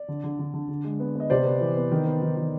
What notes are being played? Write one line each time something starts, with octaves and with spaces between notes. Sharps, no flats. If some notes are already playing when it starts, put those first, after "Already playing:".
Already playing: D5
D3
D3
D3
D3
D3
G#3
B3
B3 D#5
C3 C5 D5
B3
E3
B3
D#3
B3
D#3
D#3